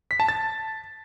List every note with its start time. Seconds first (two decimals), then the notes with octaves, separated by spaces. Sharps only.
0.11 B6
0.20 A5
0.29 A6